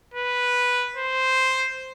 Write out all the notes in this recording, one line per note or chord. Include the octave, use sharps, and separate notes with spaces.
B4
C5